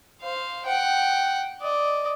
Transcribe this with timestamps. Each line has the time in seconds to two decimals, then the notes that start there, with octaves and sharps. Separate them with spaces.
0.21 C5 F5
0.66 F#5 G5
1.62 D5 D#5